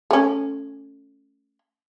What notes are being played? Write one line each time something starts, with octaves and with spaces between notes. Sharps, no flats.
A3 C#4